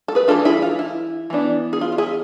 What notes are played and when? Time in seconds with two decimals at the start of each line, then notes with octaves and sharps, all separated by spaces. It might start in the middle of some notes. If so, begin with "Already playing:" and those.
0.08 A4
0.15 G#4 B4
0.28 E3 A3 D4 F4 A4
0.45 E4 G#4
0.62 F4
0.79 E4
1.30 E3 B3 D4
1.73 G#4
1.81 F4
1.92 F4
1.98 E4 G#4